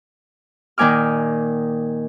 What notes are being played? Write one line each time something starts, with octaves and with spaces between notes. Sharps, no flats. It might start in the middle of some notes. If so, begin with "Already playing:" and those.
A#2 D#3 A#3 G#5 D6 F6